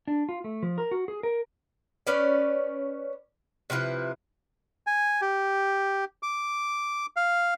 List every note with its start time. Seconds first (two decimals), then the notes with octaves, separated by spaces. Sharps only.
0.08 D4
0.29 F4
0.44 A3
0.63 F3
0.78 A#4
0.91 F#4
1.08 G#4
1.23 A#4
2.07 C#4 B4 D5
3.70 C3 F3 E4 B4
4.87 G#5
5.22 G4
6.23 D6
7.16 F5